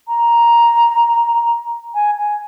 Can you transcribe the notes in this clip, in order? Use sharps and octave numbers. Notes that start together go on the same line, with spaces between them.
A#5
G#5
G#5